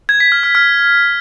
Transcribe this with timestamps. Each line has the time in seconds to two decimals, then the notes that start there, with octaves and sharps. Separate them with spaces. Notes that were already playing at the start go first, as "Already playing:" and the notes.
0.09 G#6
0.20 B6
0.32 F6
0.43 F6
0.55 F6